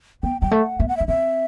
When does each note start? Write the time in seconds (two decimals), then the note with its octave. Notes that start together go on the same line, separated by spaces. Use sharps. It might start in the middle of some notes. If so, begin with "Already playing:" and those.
0.23 B3 G5
0.41 G3 G5
0.51 A3 F#5
0.80 B3 E5
0.88 F#5
0.97 E5
1.00 D4
1.08 C4 E5